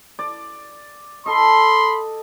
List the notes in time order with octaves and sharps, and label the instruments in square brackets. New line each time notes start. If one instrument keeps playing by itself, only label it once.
[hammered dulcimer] D5
[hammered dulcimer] A4 D#5 [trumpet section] B5 C6